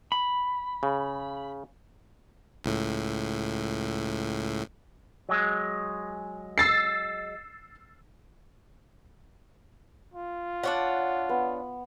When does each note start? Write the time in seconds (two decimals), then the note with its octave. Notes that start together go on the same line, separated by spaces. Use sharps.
0.12 B5
0.83 C#3
2.64 C#2 A2
5.29 F#3 G#3
6.58 E6 A6 C7
10.14 F4
10.63 D4 C#5 F#5
11.29 B3